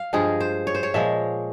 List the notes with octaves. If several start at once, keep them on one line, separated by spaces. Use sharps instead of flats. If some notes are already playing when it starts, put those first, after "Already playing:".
Already playing: F5
G2 F3 G#3 G#4
C5
C#5
C5
C#5
A#2 F3 G#3 E5